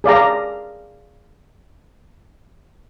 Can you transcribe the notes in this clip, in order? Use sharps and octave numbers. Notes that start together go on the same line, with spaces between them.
G#4 D5 F5 A#5